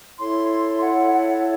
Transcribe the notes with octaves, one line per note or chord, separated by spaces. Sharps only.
E4 A4 C#5 C6
C6
F#5
F#5